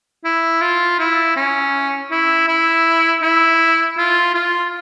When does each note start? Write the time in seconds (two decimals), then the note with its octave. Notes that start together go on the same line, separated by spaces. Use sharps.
0.24 E4
0.61 F4
0.99 E4
1.36 C#4
2.11 E4
2.48 E4
3.22 E4
3.97 F4
4.35 F4